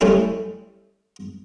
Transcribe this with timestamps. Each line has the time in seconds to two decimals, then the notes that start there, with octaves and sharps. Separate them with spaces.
0.01 G3 A3 C#4 E4